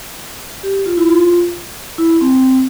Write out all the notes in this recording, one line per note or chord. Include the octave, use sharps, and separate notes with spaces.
G4
F4
E4
F4
E4
C4